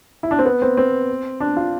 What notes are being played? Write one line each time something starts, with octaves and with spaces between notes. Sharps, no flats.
E4
D4
C4
B3
C4
C4
D4
F4